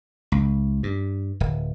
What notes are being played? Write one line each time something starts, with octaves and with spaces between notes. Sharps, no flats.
C#2
G2
D1